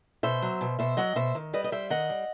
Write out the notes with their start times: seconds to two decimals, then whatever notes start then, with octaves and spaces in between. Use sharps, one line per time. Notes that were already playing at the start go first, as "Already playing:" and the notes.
0.23 B2 C5 E5
0.42 F#3
0.61 B2
0.79 B2 C5 E5
0.97 F#3 D#5 F#5
1.16 B2 C5 E5
1.35 D#3
1.53 G3 B4 D#5
1.64 D#5
1.72 G3 C5 E5
1.90 D#3 D#5 F#5
2.10 G3